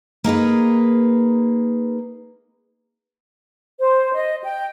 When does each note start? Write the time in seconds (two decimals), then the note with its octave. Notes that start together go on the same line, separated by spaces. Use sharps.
0.24 A#3 D#4 G#4 B4
3.78 C5
4.14 D#5
4.44 G5